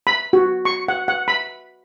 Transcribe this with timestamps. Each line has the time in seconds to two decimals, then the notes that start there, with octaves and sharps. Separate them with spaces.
0.07 B5
0.33 F#4
0.65 C#6
0.88 F#5
1.08 F#5
1.28 B5